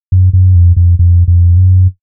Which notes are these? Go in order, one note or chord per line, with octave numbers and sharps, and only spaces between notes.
F#2
F#2
F2
F2
F2
F2
F#2